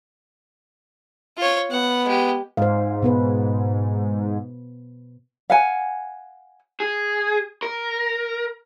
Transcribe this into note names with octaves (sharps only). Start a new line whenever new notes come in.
F4 C#5
B3 F#5
G#3 G4
G#2 C5 F5
B2 B3 B4
F5 F#5 G#5
G#4
A#4